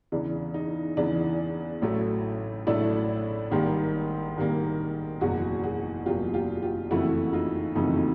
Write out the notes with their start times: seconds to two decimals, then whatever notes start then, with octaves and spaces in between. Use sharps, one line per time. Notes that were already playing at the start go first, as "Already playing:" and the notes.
0.12 E2 C#3 E3 D4
0.54 D#4
0.97 E2 C#3 E3 D4
1.82 A1 A2 F#3 A3
2.67 A1 A2 F#3 A3 D4 E4
3.51 G#1 G#2 D#3 G3 A#3
4.37 G#1 G#2 D#3 G3 A#3
5.21 F#1 E2 B2 F#3 F#4 G#4
5.63 F#4 G#4
6.06 F#1 E2 B2 F#3 F4 G4
6.34 F4 G4
6.62 F4 G4
6.91 F#1 F2 C#3 E3 A3 E4 F#4
7.33 D#4 F4
7.75 F#1 F2 C#3 E3 A3 D#4
7.97 D#4